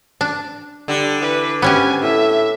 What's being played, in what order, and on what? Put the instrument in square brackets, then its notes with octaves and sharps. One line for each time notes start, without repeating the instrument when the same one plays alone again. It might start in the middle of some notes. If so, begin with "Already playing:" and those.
[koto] D4
[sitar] D3 [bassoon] G3
[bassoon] E3 [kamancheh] B4
[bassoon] C3 [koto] B3 C#4 G4 [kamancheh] G#5
[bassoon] A2 [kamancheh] E5